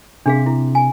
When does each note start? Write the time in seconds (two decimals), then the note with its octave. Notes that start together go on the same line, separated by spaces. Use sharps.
0.26 C3 D4 G#4 F5
0.46 E4
0.75 G#5